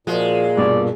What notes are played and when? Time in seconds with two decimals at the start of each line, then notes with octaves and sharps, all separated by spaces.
0.07 A#2 F3 G#3 F#4
0.57 G2 B2 D5